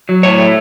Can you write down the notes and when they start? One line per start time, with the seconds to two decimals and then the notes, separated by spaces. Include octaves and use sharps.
0.09 F#3
0.23 A2 C#5
0.39 A3